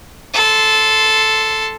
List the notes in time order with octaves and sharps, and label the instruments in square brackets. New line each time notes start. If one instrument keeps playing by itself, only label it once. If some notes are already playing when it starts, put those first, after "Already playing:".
[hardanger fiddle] A4 C6